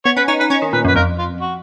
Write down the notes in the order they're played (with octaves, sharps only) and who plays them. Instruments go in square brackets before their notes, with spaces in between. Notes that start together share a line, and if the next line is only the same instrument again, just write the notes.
[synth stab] B3 [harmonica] C#5
[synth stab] C#4 [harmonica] B4
[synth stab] D#4 [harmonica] C#5
[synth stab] D#4 [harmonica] B4
[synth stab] C#4 [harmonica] C#5
[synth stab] D#3
[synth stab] A#2 [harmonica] B4
[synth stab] F#2 [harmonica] B4
[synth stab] F2 [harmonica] A#4
[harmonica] F4
F#4